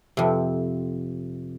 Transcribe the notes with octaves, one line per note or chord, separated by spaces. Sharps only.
F2 C3